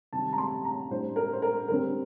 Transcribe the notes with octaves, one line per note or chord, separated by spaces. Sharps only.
C3 D#3 G3 A5
A#5
C6
A#5
A2 G3 D4 C5
A#4
C5
A#4
D3 G3 C4 A#4